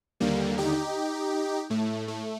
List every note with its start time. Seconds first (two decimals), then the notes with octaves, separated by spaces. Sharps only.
0.20 D#2 D3 G3 A#3
0.58 D#4 G4
1.70 A2 A3
2.08 A3